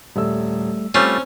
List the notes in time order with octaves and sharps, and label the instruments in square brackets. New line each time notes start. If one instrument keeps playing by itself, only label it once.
[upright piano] D#1 E6 [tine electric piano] G3 A3
[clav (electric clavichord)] G3 A3 F4 [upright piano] C4 [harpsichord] C#4